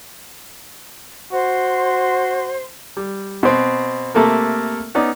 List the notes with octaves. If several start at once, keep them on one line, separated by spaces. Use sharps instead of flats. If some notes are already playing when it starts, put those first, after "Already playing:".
F#4 C5 C6
G3
B2 C4
C3 A3 A#3 A4 A#4
B3 C#4 D#4 D5